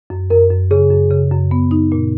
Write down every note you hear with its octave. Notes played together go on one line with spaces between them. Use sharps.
F#2
F#2 A#4
F#2
C#3 G#4
F#2
C#3
F#2
B3
D#4
A#2